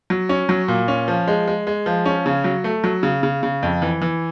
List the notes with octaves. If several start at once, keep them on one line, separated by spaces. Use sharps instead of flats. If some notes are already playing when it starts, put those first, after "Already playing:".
F#3
C#4
F#3
A#2
C#4
F3
G#3
G#3
G#3
F3
C#4
C#3
F#3
A3
F#3
C#3
C#3
C#3
F2
E3
E3